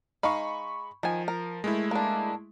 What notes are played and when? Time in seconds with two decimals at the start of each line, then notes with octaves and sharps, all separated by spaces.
0.23 G#3 D#4 F5 B5 C#6
1.03 D#3 F3 G#5
1.28 A#4
1.64 G#3 A3 E4
1.91 A#3 D4